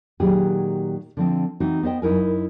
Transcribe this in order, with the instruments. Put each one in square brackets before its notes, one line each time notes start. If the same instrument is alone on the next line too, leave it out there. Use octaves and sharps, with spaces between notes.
[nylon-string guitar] A#2 D#3 F#3 G4 G#4 G#5
D3 F3 C4
E3 C4 D#4 F#4
B3 C5 D#5 G5
F#2 D#4 E4 A#4 G#5